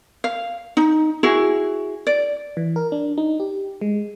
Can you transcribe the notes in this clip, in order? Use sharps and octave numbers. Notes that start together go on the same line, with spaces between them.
F5
D#4
E4 F#4 G#4
D5
E3
A#4
D4
D#4
G4
G#3